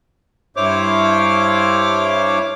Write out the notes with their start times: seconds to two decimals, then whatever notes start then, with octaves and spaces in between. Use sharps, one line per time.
0.56 G2 E4 C5 C#5 D6 F6